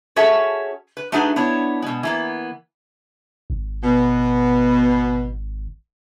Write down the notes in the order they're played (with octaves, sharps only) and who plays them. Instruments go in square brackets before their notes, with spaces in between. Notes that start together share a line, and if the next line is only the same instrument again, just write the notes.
[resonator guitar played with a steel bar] C#4 F#4 G#4 A4 C#5 E5
B4
A3 D4 D#4 F#4 G#4 B4
B3 D4 E4 C#5
B2 G#3
E3 A#3 B3
[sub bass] G#1
[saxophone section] B2